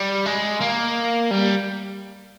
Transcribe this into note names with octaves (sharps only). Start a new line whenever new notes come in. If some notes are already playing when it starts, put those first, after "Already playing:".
Already playing: G3
G#3
A#3
G3